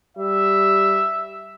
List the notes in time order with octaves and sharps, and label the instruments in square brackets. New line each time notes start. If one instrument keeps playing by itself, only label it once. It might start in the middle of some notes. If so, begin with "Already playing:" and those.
[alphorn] G3 [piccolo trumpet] E5